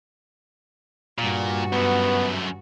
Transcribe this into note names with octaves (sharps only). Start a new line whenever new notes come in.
G2 A#2 F#4
F#2 A3 B3